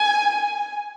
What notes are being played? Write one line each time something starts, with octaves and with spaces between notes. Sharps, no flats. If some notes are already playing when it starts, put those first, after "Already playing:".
Already playing: G#5